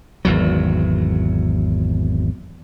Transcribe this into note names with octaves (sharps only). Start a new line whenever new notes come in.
G#1 E2 F#3